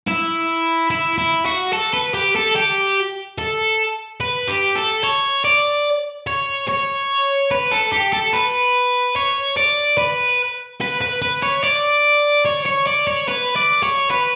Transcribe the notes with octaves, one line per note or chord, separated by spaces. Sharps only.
E4
E4
E4
F#4
A4
B4
G4
A4
G4
A4
B4
G4
A4
C#5
D5
C#5
C#5
B4
A4
G4
A4
B4
C#5
D5
B4
B4
B4
B4
C#5
D5
C#5
C#5
D5
C#5
B4
D5
C#5
B4